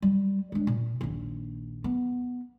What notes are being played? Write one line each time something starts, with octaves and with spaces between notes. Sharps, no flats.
G3
G#3 D4
A#2
A#1 D#2
B3